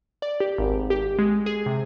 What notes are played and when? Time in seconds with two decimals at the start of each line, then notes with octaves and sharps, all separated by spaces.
0.22 D5
0.40 G4
0.58 G#1
0.90 G4
1.19 G#3
1.46 G#4
1.66 C3